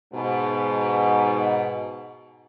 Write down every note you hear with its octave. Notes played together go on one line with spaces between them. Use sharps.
G#2 B2